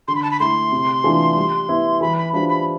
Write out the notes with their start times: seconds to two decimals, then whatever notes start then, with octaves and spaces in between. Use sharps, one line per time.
0.08 D3 C6
0.15 B5
0.23 A5
0.31 B5
0.40 A3 E4 C6
0.72 C3
1.04 E3 A3 D4 F4
1.36 G3
1.69 B3 E4
2.01 E3 B5
2.18 B5
2.33 G3 D4 F4 C5 B5
2.49 B5